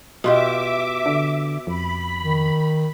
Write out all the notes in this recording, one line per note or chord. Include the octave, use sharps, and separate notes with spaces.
B2 F4 G4 E5 D6
D3
F2 B5
D#3